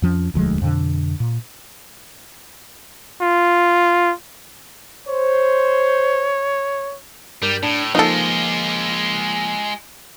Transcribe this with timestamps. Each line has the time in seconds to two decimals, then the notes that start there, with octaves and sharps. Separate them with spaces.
0.02 F2 F3 C#4
0.34 E1 D2 F3 G#3
0.62 F2 B2 D3
1.20 A#2
3.22 F4
5.07 C5 C#5
7.42 G2 G3 A#4 G6
7.63 A2 D4
7.95 F3 G#3 A#3 D#4 F4 A4